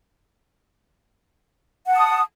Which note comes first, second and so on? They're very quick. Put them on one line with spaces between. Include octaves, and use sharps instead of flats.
F#5 A5 D#6